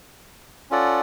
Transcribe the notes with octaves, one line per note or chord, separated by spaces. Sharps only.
C#4 F4 A4 D5 F#5